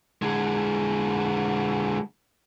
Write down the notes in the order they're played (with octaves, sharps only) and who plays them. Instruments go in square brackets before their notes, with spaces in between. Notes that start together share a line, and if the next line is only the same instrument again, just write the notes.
[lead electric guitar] D3 G#3